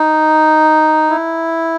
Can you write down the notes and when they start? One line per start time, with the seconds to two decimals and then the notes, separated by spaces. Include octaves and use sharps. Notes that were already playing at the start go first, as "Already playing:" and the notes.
Already playing: D#4
1.10 E4